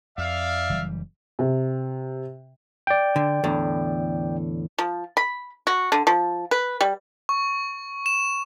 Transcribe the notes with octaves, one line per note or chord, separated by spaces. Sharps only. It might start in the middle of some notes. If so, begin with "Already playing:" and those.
F2 D5 E5 F5
F#1 E3 G3
C3
D5 G5
D3
E2 A2 D3
F3
B5
F#4
D3
F3
B4
G3
C#6
E7